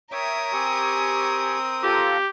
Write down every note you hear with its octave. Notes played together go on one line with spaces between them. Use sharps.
A#4 C#5 E5 G5 D#6
C4 G4 G#5 C#6
F4 G4 A4 A#5